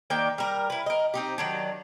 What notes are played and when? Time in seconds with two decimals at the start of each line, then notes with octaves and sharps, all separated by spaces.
0.10 D#3 A#3 D5 G5
0.38 G3 A#4
0.70 E4 B4
0.86 A#4 D#5
1.14 C4 D#4 G4
1.38 D#3 F#3 D4